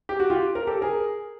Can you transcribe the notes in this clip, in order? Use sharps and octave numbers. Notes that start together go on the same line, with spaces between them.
G4
F#4
F4 G4
A#4
G4 A4
G#4 A#4